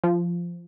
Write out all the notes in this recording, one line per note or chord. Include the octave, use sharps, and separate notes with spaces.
F3